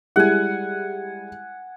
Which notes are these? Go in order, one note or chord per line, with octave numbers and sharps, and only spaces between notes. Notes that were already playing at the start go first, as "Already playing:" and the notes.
G3 G#3 E4 F#5 G#5